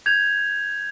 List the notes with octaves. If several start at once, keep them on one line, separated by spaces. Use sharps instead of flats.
G6 G#6 F7